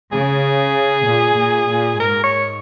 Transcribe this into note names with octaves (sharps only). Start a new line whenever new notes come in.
C#3 G#4
A#2
A#2
A#2
G#2 A#4
C#5